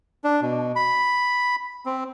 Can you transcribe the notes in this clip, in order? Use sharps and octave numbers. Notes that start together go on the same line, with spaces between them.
D4
B2
B5
C4